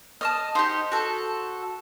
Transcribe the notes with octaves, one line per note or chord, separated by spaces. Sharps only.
D#5 A5 D#6 F6
D#4 G4 C5
F#4 A4